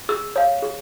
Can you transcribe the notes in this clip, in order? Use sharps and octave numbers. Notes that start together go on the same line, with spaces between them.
G#4 E6
C#5 F5
G#4